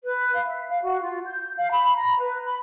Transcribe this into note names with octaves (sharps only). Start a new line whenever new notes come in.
B4
F5
E5
F5
F#4
F4
G6
F5
B5
A#5
B4
B5